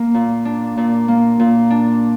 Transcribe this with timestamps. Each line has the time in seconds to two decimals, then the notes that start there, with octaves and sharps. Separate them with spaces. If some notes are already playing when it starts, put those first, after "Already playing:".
Already playing: A#3
0.14 A#2
0.45 D4
0.77 A#2
1.08 A#3
1.39 A#2
1.70 D4